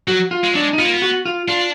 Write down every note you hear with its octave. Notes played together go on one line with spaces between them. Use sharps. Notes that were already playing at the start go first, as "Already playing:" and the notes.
F#3 F#4
F4
G#3
F#3 D4
G#3
D#4
B3 F4
A#3
B3
F#4
F4
D4 F4